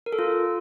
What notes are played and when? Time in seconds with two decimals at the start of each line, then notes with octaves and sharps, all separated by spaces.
0.06 A#4
0.12 A4
0.19 F4